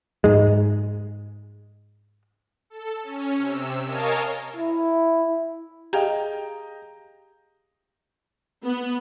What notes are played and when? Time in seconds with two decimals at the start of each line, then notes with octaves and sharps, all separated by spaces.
0.24 G#2 G#3
2.70 A4
3.03 C#4
3.38 C3 E6
3.85 A#4 C#5 D#5 F5 G#5 A5
4.56 E4
5.93 G4 G#4 D#5 F5 G5 A#5
8.64 B3